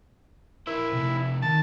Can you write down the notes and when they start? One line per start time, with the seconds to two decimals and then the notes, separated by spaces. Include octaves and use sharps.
0.67 E4 A#4 C5
0.93 C3 A3
1.42 D#3 A5